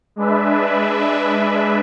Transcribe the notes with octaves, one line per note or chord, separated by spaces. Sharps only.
G#3 D4 B4 E5